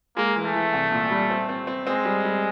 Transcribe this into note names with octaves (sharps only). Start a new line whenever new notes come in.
G#3 A#3
E3
A3
E3
C2
A#2
G3
C4
C4
C4
G#3 C4
G3
G3